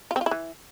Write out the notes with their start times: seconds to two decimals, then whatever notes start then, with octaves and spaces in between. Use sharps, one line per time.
0.11 F4
0.16 C4
0.21 F4
0.26 E4
0.31 E3